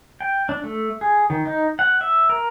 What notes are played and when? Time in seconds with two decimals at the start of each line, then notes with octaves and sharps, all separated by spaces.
0.21 G5
0.49 D4
0.64 A3
1.01 G#4
1.30 D#3
1.46 D#4
1.79 F#5
2.01 E5
2.30 A#4